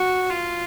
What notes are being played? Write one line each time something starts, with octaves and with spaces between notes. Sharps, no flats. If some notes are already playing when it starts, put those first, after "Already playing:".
Already playing: F#4
F4